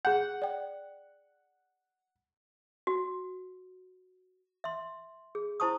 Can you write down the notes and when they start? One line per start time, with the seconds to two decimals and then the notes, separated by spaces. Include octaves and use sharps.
0.05 G#4 F#5 G6
0.42 D5 G5
2.87 F#4
4.64 E5 C6
5.35 G#4
5.60 E4 C5 A5 C#6 D#6